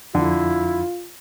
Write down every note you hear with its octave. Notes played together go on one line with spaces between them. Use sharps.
F2 D3 E4 F4